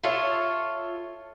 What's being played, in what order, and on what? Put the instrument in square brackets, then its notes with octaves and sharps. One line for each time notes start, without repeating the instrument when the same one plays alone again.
[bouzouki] F4 A4 C#5 E5